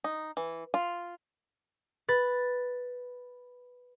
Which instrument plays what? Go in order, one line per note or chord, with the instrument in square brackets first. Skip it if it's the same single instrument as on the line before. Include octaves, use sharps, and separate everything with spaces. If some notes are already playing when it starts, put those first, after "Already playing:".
[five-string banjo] D#4
E3
F4
[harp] B4 A6